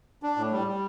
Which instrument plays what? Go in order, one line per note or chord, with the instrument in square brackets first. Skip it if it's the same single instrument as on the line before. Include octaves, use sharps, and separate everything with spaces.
[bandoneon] D4
A2
G3
G3